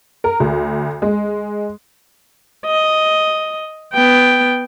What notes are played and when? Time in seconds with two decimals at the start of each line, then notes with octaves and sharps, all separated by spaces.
0.24 A#4
0.40 D2
1.02 G#3
2.66 D#5
3.94 B3 G5